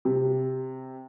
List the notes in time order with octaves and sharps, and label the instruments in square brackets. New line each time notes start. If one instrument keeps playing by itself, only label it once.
[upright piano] C3